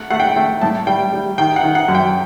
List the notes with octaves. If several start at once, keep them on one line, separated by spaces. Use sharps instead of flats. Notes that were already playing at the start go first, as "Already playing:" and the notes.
Already playing: A3 F#5
A3 F#5
G5
F#5
A3 G5
A2 A5
G3 G5
G3
D#3 G5
F#5
D#3
F#5
F#2
G5